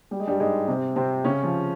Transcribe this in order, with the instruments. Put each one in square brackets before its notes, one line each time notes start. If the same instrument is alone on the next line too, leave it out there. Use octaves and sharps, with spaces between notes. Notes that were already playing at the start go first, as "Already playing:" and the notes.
[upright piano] G3
G#3
G2 G3
G#2 G#3
C3 C4
C3 C4
C#3 C#4
F3